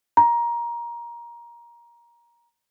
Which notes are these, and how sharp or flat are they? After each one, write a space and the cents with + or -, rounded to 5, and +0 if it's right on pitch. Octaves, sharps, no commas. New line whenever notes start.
A#5 +20